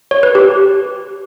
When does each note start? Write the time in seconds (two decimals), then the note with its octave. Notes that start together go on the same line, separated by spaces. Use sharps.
0.11 C#5
0.23 B4
0.35 G4